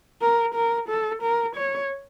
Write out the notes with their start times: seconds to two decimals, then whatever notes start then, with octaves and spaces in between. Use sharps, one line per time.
0.22 A#4
0.55 A#4
0.89 A4
1.22 A#4
1.56 C#5